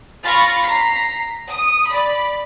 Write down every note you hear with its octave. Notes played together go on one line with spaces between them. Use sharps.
F4 F5 B5 C#6 A6 A#6
A#5 B6 C7
D#6
D5 B5